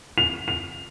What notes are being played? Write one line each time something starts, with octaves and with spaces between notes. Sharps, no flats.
F7
F7